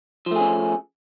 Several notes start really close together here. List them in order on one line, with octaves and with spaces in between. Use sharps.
F3 A3 G#4 C#4